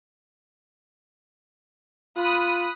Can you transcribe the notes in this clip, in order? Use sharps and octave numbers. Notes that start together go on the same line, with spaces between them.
F4 B5 D#6 F#6